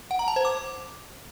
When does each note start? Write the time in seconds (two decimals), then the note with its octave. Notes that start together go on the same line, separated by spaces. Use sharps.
0.11 F#5
0.19 A#5
0.28 A5
0.36 C5
0.45 D6